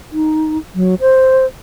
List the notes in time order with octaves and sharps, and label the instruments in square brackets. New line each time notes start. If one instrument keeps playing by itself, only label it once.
[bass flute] D#4
F#3
C5